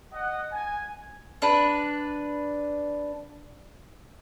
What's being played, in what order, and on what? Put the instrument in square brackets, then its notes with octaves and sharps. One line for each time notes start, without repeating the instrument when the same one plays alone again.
[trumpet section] D#5 F#5
G#5
[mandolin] D4 B4